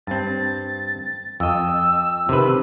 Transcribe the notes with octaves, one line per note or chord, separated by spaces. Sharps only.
G2 C4 A6
F2 D#5 E6
C3 D#3 B4